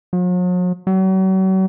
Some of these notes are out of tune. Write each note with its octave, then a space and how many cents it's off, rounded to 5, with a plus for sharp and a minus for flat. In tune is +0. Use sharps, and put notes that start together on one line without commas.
F#3 -45
F#3 +40